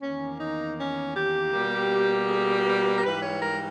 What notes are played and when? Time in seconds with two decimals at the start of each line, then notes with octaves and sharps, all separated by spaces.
0.01 E2 D#3 A#3 C#4
0.39 D#4
0.77 C#4
1.15 G4
1.52 B2 G3 A#3
2.28 G#4
2.65 B4
2.95 A#4
3.03 G#2 E3 G3 B4
3.22 C#5
3.41 A#4